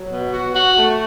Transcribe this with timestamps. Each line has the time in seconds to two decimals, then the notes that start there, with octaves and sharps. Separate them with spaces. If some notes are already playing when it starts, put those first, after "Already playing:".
Already playing: F#3
0.09 B2
0.32 F#4
0.54 F#4
0.77 A3